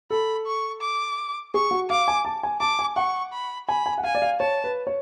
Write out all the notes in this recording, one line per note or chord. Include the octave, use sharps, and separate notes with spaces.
A4 B5
C#6
D6
G#4 C#6
F#4
F5 D6
G#5
A5
G#5
A5 D6
G#5
F#5 C#6
B5
G#5 B5
G#5
F#5
F5 G#5
D5
F5
C#5 A5
B4
C#5